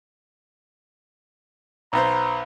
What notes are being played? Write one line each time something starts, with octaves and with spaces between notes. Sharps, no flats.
B1 B3 C5 A#5